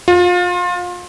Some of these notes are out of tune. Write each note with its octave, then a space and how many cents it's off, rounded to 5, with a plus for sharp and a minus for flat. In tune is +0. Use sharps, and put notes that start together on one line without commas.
F4 +30